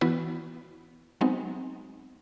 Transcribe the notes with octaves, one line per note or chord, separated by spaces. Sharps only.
E3 B3 E4 F#4 B4
F#3 G#3 B3 C4 D#4